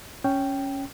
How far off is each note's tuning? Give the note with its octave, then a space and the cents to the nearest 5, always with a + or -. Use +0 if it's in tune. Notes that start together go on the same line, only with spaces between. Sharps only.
C#4 +0 G5 +0